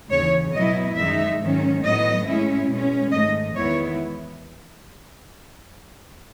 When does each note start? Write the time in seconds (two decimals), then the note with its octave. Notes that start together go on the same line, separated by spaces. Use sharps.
0.10 D#2 C#3 E3 C#5
0.54 B2 F#3 B3 E4 D#5
0.97 F#2 D#3 G#3 D#4 E5
1.40 G#2 D#3 F#3 C#4
1.83 A2 F#3 B3 D#5
2.26 A2 G#3 C#4 E4
2.70 B2 G#3 C#4
3.12 G#2 D#3 A3 D#5
3.56 E2 D#3 G#3 B3 E4 C#5